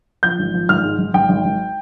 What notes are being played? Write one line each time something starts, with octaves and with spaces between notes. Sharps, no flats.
F3 G6
G#1
F3
G#1 F6
G#2
G#1
G#1 G5
G#1
G#1